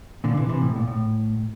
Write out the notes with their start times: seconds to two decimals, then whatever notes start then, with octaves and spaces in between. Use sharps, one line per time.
0.24 A#2 D3
0.37 C3 E3
0.49 C3 E3
0.62 A2
0.76 A#2
0.88 A2